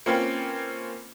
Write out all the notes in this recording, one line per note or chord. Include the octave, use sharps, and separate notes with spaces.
A#3 C4 C#4 F4 B4 G5